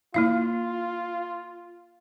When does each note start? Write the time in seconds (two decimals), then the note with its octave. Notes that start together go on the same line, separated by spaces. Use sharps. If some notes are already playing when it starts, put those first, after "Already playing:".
0.14 A#3 E4 F4 F5